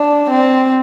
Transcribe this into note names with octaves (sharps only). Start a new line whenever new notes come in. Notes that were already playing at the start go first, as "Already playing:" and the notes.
Already playing: D4
C4